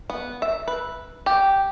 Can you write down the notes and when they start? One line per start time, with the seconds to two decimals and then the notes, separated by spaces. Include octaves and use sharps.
0.10 B3
0.42 E5
0.68 B4
1.26 G4